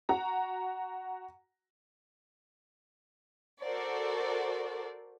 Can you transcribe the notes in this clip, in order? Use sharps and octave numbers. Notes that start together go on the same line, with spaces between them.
F#4 A#5
F#4 A4 A#4 C5 D5